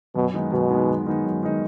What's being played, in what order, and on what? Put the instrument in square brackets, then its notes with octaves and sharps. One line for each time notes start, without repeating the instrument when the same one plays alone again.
[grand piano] F#2 [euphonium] B2
[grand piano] D#3 G#3 B3 D#4
[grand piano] F#2 [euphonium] B2
[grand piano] D#3 G#3 B3 D#4
F#2
D#3 G#3 B3 D#4
F#2
D#3 G#3 B3 D#4